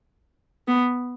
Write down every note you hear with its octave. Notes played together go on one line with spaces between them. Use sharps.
B3